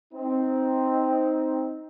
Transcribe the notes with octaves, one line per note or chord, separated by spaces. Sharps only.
C4 D#4